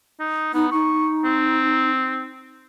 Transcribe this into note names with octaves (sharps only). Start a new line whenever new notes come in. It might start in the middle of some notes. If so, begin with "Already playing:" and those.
D#4
B3 D#4
D#4 C#6
C4